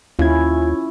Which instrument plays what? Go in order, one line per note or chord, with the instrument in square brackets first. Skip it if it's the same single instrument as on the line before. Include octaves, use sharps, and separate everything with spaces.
[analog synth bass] D#2 [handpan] C#4 E4 [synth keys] F4 G#6